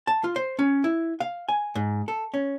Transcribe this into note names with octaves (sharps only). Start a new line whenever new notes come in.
A5
F4
C5
C#4
E4
F5
G#5
G#2
A4
C#4